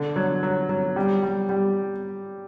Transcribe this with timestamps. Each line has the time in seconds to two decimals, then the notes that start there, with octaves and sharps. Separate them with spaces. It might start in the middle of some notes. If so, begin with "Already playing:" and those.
Already playing: D3
0.16 F#3
0.43 F#3
0.69 F#3
0.96 G3
1.23 G3
1.49 G3